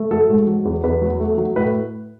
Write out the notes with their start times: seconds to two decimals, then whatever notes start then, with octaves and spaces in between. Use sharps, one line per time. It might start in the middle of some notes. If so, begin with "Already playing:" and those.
Already playing: A3
0.11 F#3 A4
0.29 G#2
0.47 F#3
0.65 E2
0.83 E2 B4
1.02 F#3
1.20 A3
1.38 F#3
1.56 A2 B4